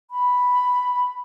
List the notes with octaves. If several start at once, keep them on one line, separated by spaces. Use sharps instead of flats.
B5